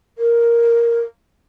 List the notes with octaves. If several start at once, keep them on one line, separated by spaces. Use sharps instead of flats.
A#4